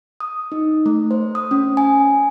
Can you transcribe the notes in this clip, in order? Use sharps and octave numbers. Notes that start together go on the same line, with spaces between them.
D#6
D#4
A3
C5
D#6
C#4
G#5